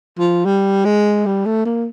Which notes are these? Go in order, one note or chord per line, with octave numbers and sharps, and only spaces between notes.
F3
G3
G#3
G3
A3
A#3